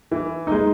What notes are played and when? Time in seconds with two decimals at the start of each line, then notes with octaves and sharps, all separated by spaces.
0.12 E3
0.47 G#3 D#4